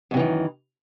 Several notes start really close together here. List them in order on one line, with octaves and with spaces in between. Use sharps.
F#2 C3 E3 D#3